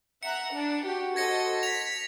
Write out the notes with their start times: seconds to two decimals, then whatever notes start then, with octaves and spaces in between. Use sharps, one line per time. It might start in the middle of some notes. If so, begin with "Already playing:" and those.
0.23 E5 F#5 A#5 C#7
0.53 D4
0.86 F#4 G4
1.16 A4 C5 D#5 G#6 A#6 C#7
1.63 B6 F7